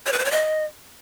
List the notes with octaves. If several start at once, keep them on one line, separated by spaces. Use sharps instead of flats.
C#5
B4
C5
C#5
D#5